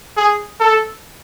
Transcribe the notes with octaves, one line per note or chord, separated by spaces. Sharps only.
G#4
A4